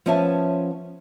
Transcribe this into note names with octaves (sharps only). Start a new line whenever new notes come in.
F3 B3 C#4 E5 G#5 A5